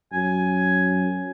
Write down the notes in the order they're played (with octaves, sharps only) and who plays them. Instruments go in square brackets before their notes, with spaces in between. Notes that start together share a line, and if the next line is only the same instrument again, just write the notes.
[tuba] F#2 [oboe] G#5